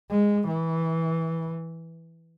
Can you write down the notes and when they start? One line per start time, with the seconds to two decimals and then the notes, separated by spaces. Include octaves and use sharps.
0.10 G#3
0.48 E3